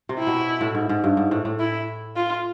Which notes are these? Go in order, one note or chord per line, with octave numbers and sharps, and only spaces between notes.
C3
E4
B2
A2
G#2
G#2
G2
G#2
A2
A2
E4
F4